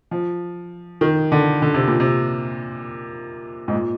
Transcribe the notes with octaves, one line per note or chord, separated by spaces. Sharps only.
F3
D#3
D3
D3
C3
A#2
C3
G#2
A#2